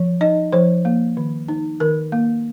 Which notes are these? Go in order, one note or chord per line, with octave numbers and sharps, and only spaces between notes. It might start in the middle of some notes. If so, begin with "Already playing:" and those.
Already playing: F3
D#4 D#5
F3 C5
A#3
D#3
D#4
D#3 A#4
A#3